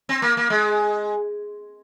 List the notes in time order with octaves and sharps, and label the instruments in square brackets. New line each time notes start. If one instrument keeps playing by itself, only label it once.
[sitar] C4
A#3
A#3
G#3